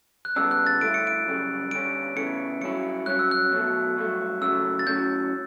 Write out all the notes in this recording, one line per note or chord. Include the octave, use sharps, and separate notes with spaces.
F#6
C#3 G3 B3 D4 E6
F#6
A6
G2 D3 A3 E4 D7
C#7
D7
F#2 C#3 G3
G2 D3 G3 C#4 D7
E2 C#3 E3 A3 C#4 C#7
G2 F#3 C#4 E4 C#7
G2 F#3 C#4 F#6
E6
F#6
B2 F#3 A3
G2 F#3 A3
C#3 F#3 A3 E6
A6
A2 F#3 C#4 G6